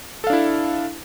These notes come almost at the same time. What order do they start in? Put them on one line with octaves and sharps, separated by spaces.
A4 F5 D4 E4